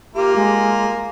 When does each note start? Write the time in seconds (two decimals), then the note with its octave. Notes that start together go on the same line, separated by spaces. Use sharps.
0.15 A#3 F4 G4
0.36 G#3